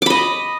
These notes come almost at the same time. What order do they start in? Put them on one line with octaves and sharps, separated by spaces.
D6 B5 D#5